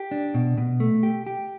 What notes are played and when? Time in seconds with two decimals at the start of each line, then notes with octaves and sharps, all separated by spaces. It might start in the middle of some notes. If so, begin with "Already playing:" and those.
Already playing: G4
0.11 D4
0.34 B2
0.58 B2
0.80 A3
1.03 G4
1.27 G4